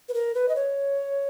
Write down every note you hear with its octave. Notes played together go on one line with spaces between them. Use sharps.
B4
A#4
B4
D#5
C#5